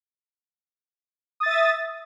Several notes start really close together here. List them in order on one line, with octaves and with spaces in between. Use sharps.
D#6 A6 E5